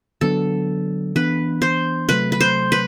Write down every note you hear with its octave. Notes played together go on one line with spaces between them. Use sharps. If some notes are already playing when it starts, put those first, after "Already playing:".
D3 F#3 B3 D4 A4
E3 B3 D4 B4
C5
C3 F#3 A3 B4
B4
C5
B4